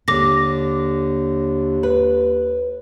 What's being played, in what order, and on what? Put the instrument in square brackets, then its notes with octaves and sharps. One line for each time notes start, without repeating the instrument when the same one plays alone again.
[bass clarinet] D#2 [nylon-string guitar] D3 [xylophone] D6 A#6
[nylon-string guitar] B4